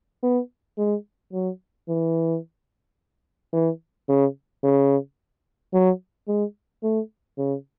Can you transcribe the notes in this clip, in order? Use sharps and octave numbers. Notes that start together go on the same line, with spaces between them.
B3
G#3
F#3
E3
E3
C#3
C#3
F#3
G#3
A3
C#3